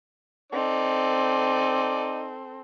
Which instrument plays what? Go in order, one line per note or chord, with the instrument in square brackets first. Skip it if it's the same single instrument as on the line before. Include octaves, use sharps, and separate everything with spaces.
[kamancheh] C4 A4 [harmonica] D#4 D5